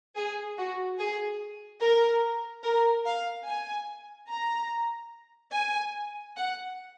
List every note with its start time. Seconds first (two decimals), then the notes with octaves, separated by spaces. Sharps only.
0.16 G#4
0.57 F#4
0.98 G#4
1.81 A#4
2.64 A#4
3.05 F5
3.46 G#5
4.29 A#5
5.53 G#5
6.36 F#5